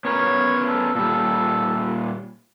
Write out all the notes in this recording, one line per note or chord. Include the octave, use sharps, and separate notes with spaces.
B3 C#4 A#4 C#5
A4
A#2 G3 A4